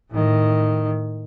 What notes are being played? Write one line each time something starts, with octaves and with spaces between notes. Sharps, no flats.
A2 D#3